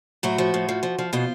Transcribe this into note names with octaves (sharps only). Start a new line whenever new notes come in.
A2 F#3 F#4
F3
A2
F3
F3
F3
B2 F3 F4